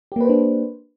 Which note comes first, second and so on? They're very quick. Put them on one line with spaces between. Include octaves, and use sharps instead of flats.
G4 A#3 B4 C5 D4